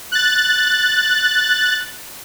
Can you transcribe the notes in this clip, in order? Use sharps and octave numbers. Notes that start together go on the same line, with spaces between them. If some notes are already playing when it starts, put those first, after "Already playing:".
F#6 A6